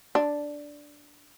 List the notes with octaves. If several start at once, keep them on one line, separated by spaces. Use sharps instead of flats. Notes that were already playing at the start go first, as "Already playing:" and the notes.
D4